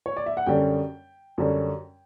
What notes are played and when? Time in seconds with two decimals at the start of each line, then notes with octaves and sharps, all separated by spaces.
0.06 C#5
0.17 D5
0.26 E5
0.37 F#5
0.46 F#2 D3 G3 C#4 G5
1.38 F#2 D3 G3 C#4